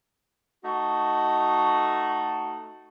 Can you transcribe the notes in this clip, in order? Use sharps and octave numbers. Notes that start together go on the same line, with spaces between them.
A3 D#4 F#4